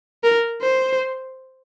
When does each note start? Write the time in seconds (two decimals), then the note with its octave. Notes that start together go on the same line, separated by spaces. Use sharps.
0.23 A#4
0.61 C5